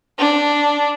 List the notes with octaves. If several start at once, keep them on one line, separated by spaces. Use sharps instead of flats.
D4